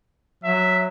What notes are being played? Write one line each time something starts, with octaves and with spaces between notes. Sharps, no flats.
F#3 E5